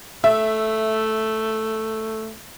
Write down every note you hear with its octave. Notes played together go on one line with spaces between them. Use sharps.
A3 E5